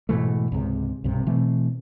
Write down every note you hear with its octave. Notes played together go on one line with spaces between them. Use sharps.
G#2 B2 E3 A3
C#2 G#2 C3
B1 G2 C3
B2 E3 A3 C4